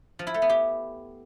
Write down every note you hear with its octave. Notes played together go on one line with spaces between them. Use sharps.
F3
E4
A3
B3
G4